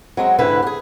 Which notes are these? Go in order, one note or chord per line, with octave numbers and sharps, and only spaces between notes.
F#3 G#3 C4
F2 G#2 D3 E4 B4
G4 G#4